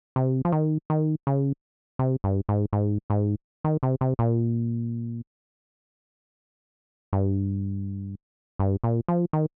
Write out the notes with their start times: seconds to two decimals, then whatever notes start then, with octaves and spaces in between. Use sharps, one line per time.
0.16 C3
0.45 F3
0.52 D#3
0.90 D#3
1.27 C#3
1.99 C3
2.24 G2
2.49 G#2
2.73 G#2
3.10 G#2
3.64 D#3
3.83 C3
4.01 C3
4.19 A#2
7.13 G2
8.59 G2
8.84 A#2
9.08 F3
9.33 D#3